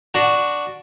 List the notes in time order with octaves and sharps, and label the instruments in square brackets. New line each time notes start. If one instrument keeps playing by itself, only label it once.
[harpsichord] D4 F#4